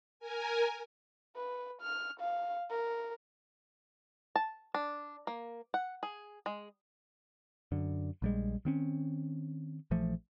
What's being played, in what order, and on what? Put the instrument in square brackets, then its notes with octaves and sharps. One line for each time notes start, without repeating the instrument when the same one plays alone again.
[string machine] A#4 G#5
[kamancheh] B4
F6
F5
A#4
[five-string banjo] A5
D4
A#3
F#5
G#4
G#3
[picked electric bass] F#2 D3
A#1 G3 G#3
D#3 C4 C#4
A#1 E3 F3 A3